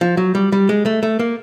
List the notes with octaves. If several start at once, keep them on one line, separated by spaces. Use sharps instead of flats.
F3
F#3
G3
G3
G#3
A3
A3
A#3